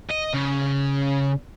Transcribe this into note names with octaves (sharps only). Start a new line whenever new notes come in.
D#5
C#3